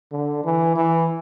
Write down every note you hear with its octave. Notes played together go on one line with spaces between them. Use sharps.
D3
E3
E3